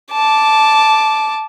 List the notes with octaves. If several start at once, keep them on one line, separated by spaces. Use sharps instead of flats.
A5 D6